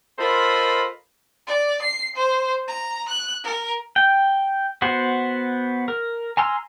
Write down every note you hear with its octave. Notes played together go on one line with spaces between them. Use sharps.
F4 A4 A#4 C5 D#5 B5
D5
C7
C5
A#5
F#6
A#4
G5
B3 F#4 C5
A#4
G#5 A#5 C6 E6 F6